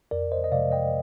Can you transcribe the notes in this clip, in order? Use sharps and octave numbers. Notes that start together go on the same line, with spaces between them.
F2 A#4 D5
C5 D#5
D#5
C3 F3 G#3 D5 F5
D#5 G5